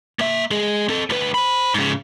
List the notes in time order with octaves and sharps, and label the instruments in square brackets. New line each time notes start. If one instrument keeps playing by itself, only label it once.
[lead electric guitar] A#3 E5
G#3 G#4
C4 A4
D2 B4
C5 B5
G#2 C#3